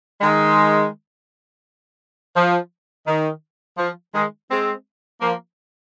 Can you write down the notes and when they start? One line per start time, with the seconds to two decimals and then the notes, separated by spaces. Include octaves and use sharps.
0.21 D#3 G#3
2.35 F3
3.06 D#3
3.77 F3
4.13 D#3 G#3
4.49 G#3 C4
5.20 F3 A#3